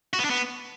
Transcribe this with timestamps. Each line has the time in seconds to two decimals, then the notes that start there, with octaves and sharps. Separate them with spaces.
0.13 F#4
0.19 B3
0.25 D4
0.30 B3